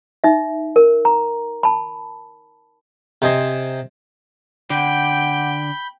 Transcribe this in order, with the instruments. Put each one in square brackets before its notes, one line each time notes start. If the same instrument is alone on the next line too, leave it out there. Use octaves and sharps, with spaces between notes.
[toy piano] D#4 E5
A#4
A#5
A5 B5
[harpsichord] C3 C5 D#5 G#5 C6
[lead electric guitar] D3 [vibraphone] F#5 D6 [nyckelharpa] G5 [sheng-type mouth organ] B5 G6